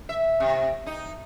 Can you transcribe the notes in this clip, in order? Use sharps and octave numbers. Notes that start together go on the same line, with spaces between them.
E5
C3
D#4